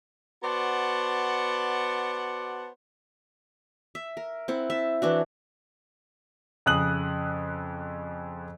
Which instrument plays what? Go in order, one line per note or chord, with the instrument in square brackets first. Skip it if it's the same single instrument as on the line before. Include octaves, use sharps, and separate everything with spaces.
[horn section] B3 F#4 C5 D5 F#5 A5
[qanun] E5
A#4
C4 E4 F#5
E5 A5
E3 D4 F#4
[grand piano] F2 C#3 D#6 F#6 F#7